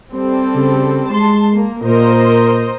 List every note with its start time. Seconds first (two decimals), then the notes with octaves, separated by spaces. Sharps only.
0.13 G3 C4 A4
0.55 C#3
1.10 G#3 A5 C6
1.53 A#3
1.83 A#2 A#4 C5 D#5